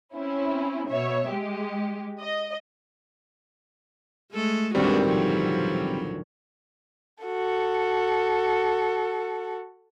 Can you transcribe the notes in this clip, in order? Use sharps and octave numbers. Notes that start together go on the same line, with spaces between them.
C4 C#4 E4
B2 C#5 E5
G#3 G4
D#5
G#3 A3 A4
G#1 D2 B2 G3 G#3 C4 D4 F#4
A#2 F3 F#3
F#4 A4